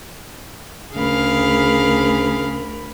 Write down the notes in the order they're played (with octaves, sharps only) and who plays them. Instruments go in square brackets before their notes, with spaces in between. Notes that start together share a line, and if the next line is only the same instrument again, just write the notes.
[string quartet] D2 A#4 B5 [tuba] C#3 [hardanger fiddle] G#4 F5